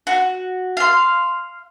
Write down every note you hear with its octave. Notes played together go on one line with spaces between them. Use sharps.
F#4
F5 C6